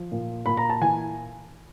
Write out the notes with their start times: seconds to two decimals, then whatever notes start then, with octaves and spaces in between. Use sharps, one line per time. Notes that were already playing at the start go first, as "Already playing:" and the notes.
Already playing: F3
0.12 A#2
0.46 A#2 B5
0.57 A#5
0.70 A5
0.81 E3 G#5